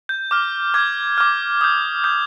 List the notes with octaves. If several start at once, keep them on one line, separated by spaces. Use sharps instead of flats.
G6
D6 F6
D6 F6 G#6
D6 F6
D#6 G6
D#6 G6